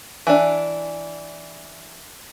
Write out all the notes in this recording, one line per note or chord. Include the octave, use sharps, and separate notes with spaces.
E3 D4